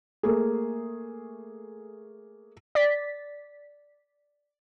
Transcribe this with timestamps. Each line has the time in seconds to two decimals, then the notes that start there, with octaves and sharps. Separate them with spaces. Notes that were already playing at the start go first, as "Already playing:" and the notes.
0.23 A3 A#3 G#4
2.75 D5 A6 B6